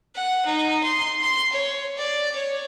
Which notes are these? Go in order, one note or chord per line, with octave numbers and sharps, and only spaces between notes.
F#5
D#4
C6
C6
C#5
D5
C#5